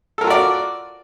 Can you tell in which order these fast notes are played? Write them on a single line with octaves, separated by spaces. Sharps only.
A4 A#4 F4 F#4 D5